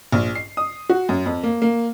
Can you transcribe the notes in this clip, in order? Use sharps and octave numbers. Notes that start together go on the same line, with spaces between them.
A#1
C7
D#6
F#4
F#2
F2
A#3
A#3